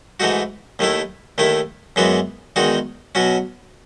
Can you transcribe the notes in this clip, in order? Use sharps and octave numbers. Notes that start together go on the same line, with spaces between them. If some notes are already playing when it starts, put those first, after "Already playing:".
G#2 E3 A3 D#4 F#4
D#2 D#3 A3 E4
D#2 D#3 A3 E4
F#2 E3 G#3 B3 F#4
E2 D#3 G#3 D#4 F#4
B2 F#3 C#4 F#4